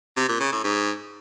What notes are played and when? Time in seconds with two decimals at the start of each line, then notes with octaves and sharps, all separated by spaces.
0.17 C3
0.29 A#2
0.40 C#3
0.52 A2
0.64 G#2